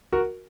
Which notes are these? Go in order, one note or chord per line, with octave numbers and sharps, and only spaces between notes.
F#4 A#4